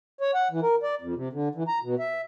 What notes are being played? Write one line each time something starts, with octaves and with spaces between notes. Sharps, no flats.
C#5
F#5
E3
A#4
D5
F2
C3
D3
E3
A#5
B2
E5